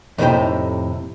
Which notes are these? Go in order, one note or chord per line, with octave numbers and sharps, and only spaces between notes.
F2 A2 C3 D#4 C5 G5